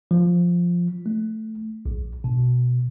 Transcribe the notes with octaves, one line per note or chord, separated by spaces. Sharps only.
F3
A3
A#1
B2